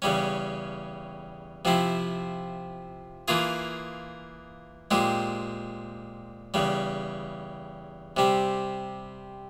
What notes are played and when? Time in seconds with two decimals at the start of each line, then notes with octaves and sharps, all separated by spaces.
0.02 E2 C#3 G3 C#4
1.65 C3 F3 C4 E4
3.28 E3 A#3 F4 G#4
4.91 A#2 G#3 C4 G4
6.54 E2 C#3 G3
8.17 C3 G3 C4